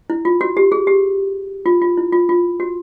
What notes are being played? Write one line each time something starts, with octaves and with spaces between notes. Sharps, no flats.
E4
F4
F#4
G4
G#4
G4
F4
F4
E4
F4
F4
F#4